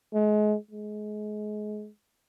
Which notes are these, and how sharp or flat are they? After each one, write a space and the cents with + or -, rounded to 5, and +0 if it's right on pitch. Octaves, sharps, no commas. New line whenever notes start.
G#3 +30
G#3 +30